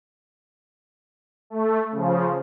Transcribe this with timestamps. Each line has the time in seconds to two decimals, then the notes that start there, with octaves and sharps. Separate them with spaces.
1.50 A3
1.92 C#3 F3